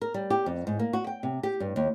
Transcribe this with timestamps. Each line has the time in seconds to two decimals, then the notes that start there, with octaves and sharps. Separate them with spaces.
0.02 A#4
0.14 G3
0.30 G4
0.46 F2
0.67 G#2
0.79 A#3
0.93 F#4
1.07 G5
1.23 C3
1.43 G4
1.60 G2
1.76 D#2